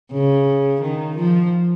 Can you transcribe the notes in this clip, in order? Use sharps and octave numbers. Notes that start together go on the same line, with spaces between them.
C#3
D#3
F3